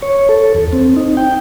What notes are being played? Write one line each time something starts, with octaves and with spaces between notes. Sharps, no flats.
C#5
A4
E2
C4
D#4
G5